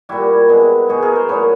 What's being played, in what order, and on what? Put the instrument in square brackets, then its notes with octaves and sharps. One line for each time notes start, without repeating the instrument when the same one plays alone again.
[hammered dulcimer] A#2 G3 E4 F#4
B2 G#3
B2 G#3 F#4 G#4
G#4 A#4
A#4 C5
A#2 F#3 A3 B4 C#5